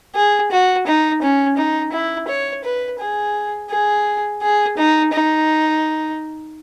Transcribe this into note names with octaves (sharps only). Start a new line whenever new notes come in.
G#4
F#4
D#4
C#4
D#4
E4
C#5
B4
G#4
G#4
G#4
D#4
D#4